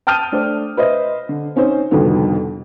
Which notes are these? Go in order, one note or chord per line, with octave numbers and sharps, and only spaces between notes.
G5 A5 D#6 F6 G6 D#7
A3 D4 C5
B4 C5 D#5 E5
D3
C4 C#4 D#4 C5
C2 F2 B2 D3 D#3 B3